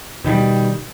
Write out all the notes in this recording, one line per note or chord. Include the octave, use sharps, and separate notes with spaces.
B2 D#3 E3 G3